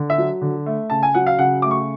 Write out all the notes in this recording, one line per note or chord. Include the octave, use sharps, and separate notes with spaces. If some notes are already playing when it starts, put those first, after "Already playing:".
Already playing: D3
E5
F#3
D3
A3
C#3 A5
G#5
F#3 F#5
F5
C#3 F#5
A3 D6
C#6